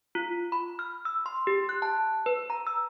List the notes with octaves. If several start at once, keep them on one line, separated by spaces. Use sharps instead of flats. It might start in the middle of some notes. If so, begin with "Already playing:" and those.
F4
B5
F6
E6
C6
G4
F#6
A5
B4
A#5
E6